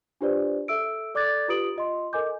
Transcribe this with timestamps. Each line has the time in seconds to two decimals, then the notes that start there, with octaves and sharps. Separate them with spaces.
0.21 D4 F4 G4 B4 C5 D5
0.68 A4 E5 E6 D7
1.15 A4 D5 D6 F#6 G#6 A6
1.48 F4 G4 B4 D#6 D7 F#7
1.76 F4 D#5 C6
2.13 A4 A#4 D#5 G#5 D6 G6